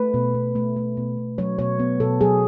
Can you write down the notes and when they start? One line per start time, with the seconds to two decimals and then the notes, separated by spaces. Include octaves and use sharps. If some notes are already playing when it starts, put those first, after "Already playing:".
Already playing: A3 B4
0.14 B2
0.34 B2
0.55 A3
0.76 A3
0.97 B2
1.17 B2
1.38 F#3 C#5
1.59 B2 C#5
1.79 B3
2.00 B2 A4
2.21 F#3 G#4